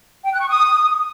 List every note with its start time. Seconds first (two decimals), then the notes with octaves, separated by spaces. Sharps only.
0.24 G5
0.32 F#6
0.40 C#6
0.49 D#6